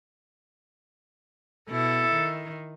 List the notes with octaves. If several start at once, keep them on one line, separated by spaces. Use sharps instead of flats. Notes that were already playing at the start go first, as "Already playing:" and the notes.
B2 E4 A4
D#3